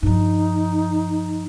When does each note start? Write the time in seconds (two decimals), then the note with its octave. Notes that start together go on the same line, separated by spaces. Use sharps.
0.03 G2 F3 D#4